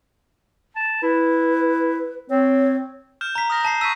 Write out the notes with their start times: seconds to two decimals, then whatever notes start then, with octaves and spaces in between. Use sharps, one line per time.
0.76 A5
1.03 E4 B4
2.30 C4 C#5
3.21 F6 G6 E7
3.35 A#5 B6
3.50 D#6 F6 A#6
3.65 A5 B6 C7
3.81 C#6 E6 B6 D#7